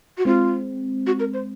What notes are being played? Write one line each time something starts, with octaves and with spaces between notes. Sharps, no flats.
F#4
G#3 C4 F4
F#4
A#4
C5